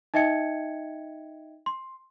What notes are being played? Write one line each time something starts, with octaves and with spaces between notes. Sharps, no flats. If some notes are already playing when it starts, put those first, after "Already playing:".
D#4 D#5 E5 G5 G#6 C#7
C6